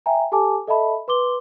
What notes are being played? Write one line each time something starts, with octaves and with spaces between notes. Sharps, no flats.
E5 G5 G#5 A#5
G4 A4 G#5 A5 D6
A4 D#5 E5 A5 B5
B4 C6 D6 G7